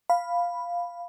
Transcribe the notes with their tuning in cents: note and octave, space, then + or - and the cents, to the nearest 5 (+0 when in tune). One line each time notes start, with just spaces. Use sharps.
F5 +0 B5 +0